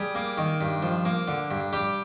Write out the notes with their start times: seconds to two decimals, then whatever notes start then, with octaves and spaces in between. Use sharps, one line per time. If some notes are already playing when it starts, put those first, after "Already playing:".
Already playing: G3 G#4
0.15 A#3
0.38 D#3
0.61 G2
0.83 F3
1.05 A#3
1.28 D3
1.51 G2
1.73 G3 G4